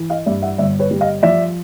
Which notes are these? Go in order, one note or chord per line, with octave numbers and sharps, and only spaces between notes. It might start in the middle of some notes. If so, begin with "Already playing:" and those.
Already playing: E3
D#5 F5
G2 D5 E5
E5 F#5
G1 D5 E5
B4 C#5
G3
D#5 F5
F3 D5 E5